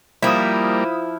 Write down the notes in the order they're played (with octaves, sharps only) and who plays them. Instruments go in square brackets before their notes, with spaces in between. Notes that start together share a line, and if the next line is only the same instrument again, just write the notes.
[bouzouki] F3 E4 [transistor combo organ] G3 A#3 [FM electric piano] B5 D#6